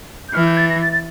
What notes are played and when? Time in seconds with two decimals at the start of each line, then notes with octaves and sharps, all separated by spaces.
0.28 G6
0.34 E3 F6
0.46 G6
0.57 A6
0.69 A#6
0.82 A6
0.92 A6